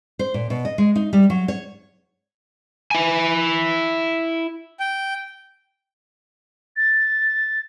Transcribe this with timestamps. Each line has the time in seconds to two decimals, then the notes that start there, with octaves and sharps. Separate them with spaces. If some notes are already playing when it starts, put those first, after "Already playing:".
0.19 C5
0.34 A#2
0.50 B2
0.65 D#5
0.78 G#3
0.96 D#4
1.13 G3
1.30 F#3
1.48 C#5
2.91 E4 G#5
4.80 G5
6.76 A6